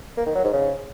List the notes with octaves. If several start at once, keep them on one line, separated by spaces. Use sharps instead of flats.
A#3
D#3
F#3
G#2
C#3